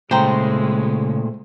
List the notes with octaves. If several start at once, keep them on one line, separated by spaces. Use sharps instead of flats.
A#2 C#3 G#3 A3 C5 G5 A#5